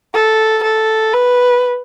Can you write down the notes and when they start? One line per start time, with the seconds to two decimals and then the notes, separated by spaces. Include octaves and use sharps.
0.14 A4
0.64 A4
1.13 B4